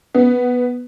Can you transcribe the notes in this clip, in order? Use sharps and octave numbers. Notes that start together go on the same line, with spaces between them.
B3